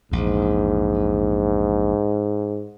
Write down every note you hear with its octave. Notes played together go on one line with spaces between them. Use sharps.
A#1 E2 G#2